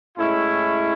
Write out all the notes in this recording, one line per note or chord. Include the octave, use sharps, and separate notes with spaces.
A2 G#3 C#4 E4